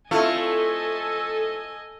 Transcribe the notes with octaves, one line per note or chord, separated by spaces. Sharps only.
A3 C4 E4 F4 A4 D#5 G#5